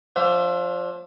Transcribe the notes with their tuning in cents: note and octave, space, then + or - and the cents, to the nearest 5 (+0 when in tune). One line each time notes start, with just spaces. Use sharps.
F3 +15 D4 -25 E5 +25